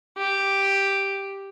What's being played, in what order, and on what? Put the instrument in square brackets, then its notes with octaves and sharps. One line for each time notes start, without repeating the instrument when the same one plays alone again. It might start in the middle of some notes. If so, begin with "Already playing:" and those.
[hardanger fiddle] G4